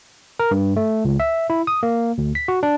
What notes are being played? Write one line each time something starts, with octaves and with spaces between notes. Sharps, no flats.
A#4
G2
A3
C#2
E5
E4
D#6
A#3
D2
B6
F#4
D4